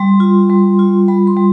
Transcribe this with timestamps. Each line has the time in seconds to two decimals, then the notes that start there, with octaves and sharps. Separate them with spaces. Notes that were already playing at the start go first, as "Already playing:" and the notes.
Already playing: G3 C6
0.20 F4
0.50 G3
0.79 F4
1.08 G3 B5
1.27 C6
1.37 G3